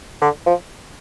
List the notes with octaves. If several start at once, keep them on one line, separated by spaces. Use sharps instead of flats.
D3
F3